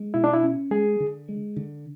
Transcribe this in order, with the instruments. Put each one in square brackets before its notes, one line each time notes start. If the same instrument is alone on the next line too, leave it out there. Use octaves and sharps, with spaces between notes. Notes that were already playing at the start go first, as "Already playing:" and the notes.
Already playing: [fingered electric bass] G#3
[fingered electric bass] B2 [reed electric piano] E4
[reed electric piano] D4
E4
[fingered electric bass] C#4
[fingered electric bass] G#3 [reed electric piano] G#4
[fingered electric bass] D3
G#3
D3